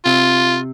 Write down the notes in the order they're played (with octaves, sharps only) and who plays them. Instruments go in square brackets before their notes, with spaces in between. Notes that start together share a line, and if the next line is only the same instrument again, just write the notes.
[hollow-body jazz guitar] C3 [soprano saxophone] F4